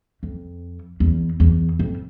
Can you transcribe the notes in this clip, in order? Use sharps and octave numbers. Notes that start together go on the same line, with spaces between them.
F2
E2
E2
F2